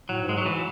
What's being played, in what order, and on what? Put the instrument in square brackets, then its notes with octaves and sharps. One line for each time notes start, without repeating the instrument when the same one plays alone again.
[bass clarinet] A2 [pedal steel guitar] F#3
[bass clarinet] G#2
[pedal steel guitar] G#3
F#3
E3